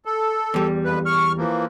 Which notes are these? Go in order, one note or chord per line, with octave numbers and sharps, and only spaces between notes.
A4
E2 G3
F2 B4
C#6 F6
E3 F3 A#3